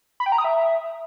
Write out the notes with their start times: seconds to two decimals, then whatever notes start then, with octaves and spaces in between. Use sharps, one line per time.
0.20 B5
0.26 G5
0.32 A#5
0.38 D#6
0.44 E5